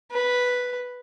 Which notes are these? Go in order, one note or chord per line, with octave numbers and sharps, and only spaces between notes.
B4